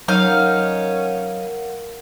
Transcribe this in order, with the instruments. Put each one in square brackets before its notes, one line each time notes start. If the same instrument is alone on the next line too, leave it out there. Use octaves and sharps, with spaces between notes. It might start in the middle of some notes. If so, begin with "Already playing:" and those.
[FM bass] F#3 [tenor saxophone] C#4 [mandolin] D#4 F5 F6 [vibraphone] A#4 F#5